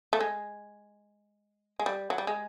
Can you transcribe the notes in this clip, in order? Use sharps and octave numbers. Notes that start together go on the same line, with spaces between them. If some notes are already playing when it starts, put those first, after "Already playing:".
A3
G#3
G#3
G3
F#3
G3
G#3